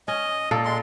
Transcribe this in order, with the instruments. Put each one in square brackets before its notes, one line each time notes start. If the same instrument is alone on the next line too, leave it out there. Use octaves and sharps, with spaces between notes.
[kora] C#4 [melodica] D#5
[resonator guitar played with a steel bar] A#2 [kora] A4
[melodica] G#3 C6